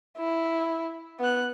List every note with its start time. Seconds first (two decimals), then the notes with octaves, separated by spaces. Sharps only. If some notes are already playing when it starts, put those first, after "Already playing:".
0.17 E4
1.20 B3 F#6